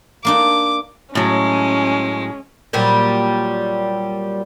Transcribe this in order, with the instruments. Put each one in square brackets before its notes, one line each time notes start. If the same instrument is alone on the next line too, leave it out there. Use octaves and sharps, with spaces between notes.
[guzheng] A#3 D4 D#4 [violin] D6
[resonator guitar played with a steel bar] A2 F#3 [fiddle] G#3 [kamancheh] C#4
[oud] A#2 F#3 G3